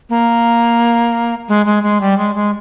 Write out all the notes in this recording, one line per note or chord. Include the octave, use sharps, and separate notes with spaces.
A#3
G#3
G#3
G#3
G3
G#3
G#3